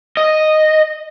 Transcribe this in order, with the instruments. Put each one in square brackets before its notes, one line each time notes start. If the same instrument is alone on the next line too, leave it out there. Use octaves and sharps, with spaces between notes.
[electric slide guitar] D#5